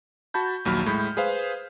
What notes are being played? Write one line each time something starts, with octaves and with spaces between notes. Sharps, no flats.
F#4 A5 B5 G6
A#1 D#2 F#3 B5 F6
A2 G#3 B5 G6
G#4 B4 C5 F5